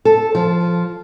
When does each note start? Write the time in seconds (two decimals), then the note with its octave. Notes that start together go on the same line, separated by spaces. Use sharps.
0.05 A4
0.35 F3